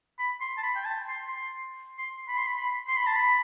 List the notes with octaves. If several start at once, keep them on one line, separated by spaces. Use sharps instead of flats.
B5
C6
A5
B5
G5
A5
C6
C6
C6
B5
C6
B5
B5
C6
B5
A5
B5